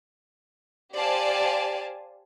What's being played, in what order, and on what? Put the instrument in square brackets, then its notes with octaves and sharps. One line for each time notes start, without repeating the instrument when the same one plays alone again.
[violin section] G4 C5 D5 F5 G#5 A5